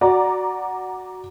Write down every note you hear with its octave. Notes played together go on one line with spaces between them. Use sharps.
F#4 D5 A#5